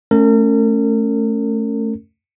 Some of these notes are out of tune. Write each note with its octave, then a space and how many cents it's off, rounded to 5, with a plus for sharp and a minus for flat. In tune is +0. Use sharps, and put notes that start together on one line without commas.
A3 +0 C#4 +0 A#4 -40